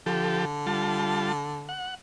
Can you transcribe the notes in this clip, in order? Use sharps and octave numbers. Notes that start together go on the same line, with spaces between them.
D3 F3 G4 A4
G3 F4 A5
F#5